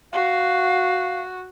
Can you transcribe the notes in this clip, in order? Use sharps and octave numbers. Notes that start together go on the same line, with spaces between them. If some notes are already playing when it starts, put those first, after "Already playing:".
F#4 F5